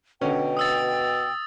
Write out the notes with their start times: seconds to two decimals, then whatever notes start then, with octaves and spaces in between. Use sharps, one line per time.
0.21 B2 D3 C#4 G5
0.57 D#6 E6 A6